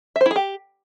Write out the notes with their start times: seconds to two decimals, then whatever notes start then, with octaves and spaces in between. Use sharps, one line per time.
0.16 E5
0.21 C5
0.26 E4
0.31 G#4
0.36 G4